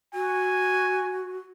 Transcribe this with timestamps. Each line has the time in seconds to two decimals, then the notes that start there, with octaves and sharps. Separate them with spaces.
0.14 F#4 G#5